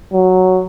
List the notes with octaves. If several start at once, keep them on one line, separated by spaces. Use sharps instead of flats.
F#3